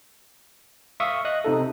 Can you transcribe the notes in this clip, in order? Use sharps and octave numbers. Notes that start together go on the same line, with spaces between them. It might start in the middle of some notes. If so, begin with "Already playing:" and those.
E5 F5 C#6 D#6
D#5 D#6 F#6
C3 D#4 A4